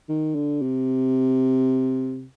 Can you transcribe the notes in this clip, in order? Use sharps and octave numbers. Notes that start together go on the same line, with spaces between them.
D#3
D3
C3